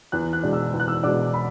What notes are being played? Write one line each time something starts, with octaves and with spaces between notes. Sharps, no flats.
E2 F#6
F#6
B2 G#3 D4
E6
E2
F#6
E6
B2 G#3 D4 D6
B5